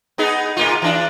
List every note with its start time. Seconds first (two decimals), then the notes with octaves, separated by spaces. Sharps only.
0.18 B3 D#4 G#4
0.57 A2 A#3 F4
0.82 E3 D4